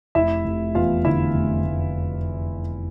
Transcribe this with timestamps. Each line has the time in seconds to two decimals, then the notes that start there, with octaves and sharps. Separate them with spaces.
0.15 F1 E4 E5
0.45 F1
0.75 E2 F4 F5
1.05 D3 E4 E5
1.34 F1
1.65 F1